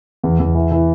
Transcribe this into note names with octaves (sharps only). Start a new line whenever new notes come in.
E2
E2
E3
E3